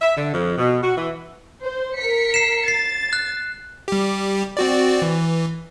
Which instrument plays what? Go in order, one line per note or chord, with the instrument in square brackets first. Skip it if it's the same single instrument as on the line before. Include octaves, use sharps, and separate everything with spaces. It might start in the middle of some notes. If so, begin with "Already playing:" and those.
[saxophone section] E5
D3
F2
B2
F#4
E3
[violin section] C5
A#4 B6 C#7
[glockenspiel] C7 E7
[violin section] A6 [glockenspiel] C7
[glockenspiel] F#6
[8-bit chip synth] G3 G4
C4 F#4 D5
E3